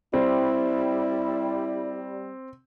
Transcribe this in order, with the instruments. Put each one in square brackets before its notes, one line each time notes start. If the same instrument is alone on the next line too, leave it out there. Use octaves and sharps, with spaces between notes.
[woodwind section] G3 [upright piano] C4 [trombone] E4